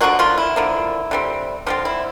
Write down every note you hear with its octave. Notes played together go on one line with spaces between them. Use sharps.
D3 F3 F#3 A#3 F#4
F3 F4
E4
D3 F3 A#3
D3 G3 C4
D3 F3 G3 C4 F4
E4